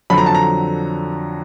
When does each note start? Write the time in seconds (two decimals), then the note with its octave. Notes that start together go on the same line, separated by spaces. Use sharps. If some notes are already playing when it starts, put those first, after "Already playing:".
0.10 F2 D3 F#3 B5
0.18 A#5
0.26 A5
0.34 A#5